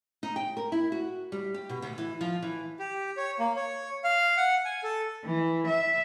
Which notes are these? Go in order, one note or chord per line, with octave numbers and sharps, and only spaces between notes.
D#4
G5
A#4
E4
F#4
G3
G4
B2
D2
E3
F3
E3
G4
C#5
A#3
C#5
F5
F#5
G#5
A4
E3
E5